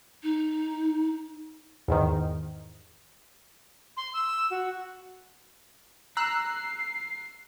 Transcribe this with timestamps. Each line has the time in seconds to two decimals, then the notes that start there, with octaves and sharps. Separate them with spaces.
0.23 D#4
1.88 E2 G#2 D#3
3.97 C6
4.14 E6
4.51 F#4
6.17 A#5 E6 F#6 C7